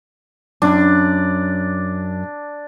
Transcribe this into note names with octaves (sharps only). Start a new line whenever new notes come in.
F#2 D4